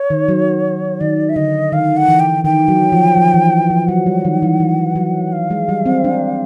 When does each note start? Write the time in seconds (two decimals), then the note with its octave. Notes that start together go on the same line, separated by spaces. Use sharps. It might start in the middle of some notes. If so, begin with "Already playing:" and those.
Already playing: C#5
0.10 D#3
0.28 F#3
1.00 D#3 D5
1.29 E5
1.36 D3 D#5
1.72 D#3 F5
1.97 F#5
2.08 E3
2.20 G5
2.45 D#3 G5
2.68 F#3
2.92 F3
3.17 F3
3.34 E3
3.70 F3
3.88 F#3 F#5
4.06 G3
4.25 D#3
4.42 E3
4.60 E3
4.96 F#3
5.32 F5
5.51 G#3
5.69 G3
5.86 C4
6.04 D4